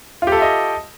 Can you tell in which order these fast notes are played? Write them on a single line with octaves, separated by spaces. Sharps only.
F4 G4 A4 E5 D#5